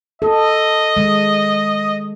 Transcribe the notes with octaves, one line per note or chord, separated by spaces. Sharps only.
A4 D#5
D#3 G#3